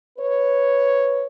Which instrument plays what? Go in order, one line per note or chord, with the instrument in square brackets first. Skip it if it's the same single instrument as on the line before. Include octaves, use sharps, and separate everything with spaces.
[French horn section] B4 C#5